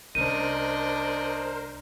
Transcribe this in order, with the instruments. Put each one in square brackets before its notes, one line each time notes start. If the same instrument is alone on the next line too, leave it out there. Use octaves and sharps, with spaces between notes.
[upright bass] C2 C#4 [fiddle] D4 D#5 [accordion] A#4 C5 [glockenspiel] D#7